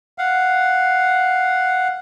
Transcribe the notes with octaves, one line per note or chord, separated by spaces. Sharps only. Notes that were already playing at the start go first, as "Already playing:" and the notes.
F5 F#5